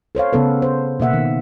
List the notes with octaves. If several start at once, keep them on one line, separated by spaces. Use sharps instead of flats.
A4 C5 C#5 F5
C#3 B3 A4 B4
C5
B2 A#3 E5 F#5
D#3